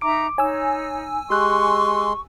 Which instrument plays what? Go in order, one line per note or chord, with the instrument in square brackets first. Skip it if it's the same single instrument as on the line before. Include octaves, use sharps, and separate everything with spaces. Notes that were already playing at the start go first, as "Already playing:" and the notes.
[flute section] D#4 E5 A#5 [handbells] D6 D7
[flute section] D#4 [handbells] C#5 [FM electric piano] G#5 E6
[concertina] G#3 C6 [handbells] G4 F#6 [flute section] C#6